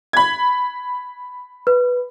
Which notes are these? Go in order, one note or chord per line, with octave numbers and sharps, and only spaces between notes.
B5 G#6
B4